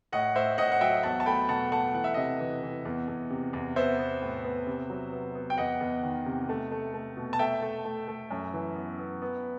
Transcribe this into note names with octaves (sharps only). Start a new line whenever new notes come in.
A2 D#5 F#5
A2 C5 E5
A2 D#5 F#5
F#5
F#3 E5 G5
E2 F#5 A5
A5
A3 G5 B5
B2 F#5 A5
A3 F#5 A5
E3 F#5
E5
C3 D#5 F#5
E3
E3
E2
E2
C3
E2
B3 C5 E5
B3
A2
B3
C3
F#3
B3
B3
G5
E2 D#5 F#5
E2
D#3
C3
A3
A3
A3
B2
A5
A3 E5 G5
A3
A3
A3
F#2
E3
B3
B3
B3